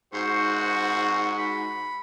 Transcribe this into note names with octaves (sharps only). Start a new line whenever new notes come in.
G#2 F#4 C5 C#6
B5